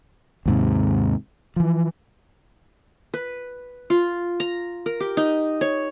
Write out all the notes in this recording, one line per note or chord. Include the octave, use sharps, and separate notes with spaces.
D#2 G#2 C3
E3 F3
B4
F4
A#5
A#4
G4
D#4
C#5